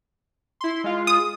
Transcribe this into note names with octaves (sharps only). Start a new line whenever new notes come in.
E4 C6
G#3 F4
D#6